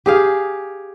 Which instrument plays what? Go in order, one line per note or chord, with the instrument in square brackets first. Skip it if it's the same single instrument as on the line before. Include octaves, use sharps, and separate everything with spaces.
[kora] G4 G#4 F5